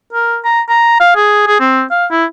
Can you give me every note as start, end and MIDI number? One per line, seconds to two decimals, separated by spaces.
0.13 0.38 70
0.45 0.61 82
0.69 0.95 82
1.00 1.12 77
1.16 1.42 68
1.47 1.56 68
1.60 1.83 60
1.91 2.06 77
2.11 2.25 64